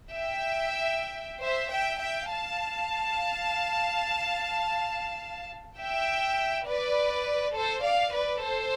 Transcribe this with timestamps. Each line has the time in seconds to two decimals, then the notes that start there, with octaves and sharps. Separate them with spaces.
0.11 E5 G5
1.42 C5 E5
1.71 E5 G5
2.00 E5 G5
2.30 F5 A5
5.79 E5 G5
6.67 B4 D5
7.54 A4 C5
7.83 D5 F5
8.13 B4 D5
8.41 A4 C5